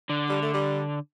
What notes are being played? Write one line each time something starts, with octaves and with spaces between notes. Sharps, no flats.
D3
G3
A3
G3